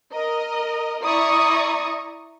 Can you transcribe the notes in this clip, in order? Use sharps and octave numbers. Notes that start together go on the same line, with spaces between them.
A#4 D#5
E4 D5 A#5 C#6 D#6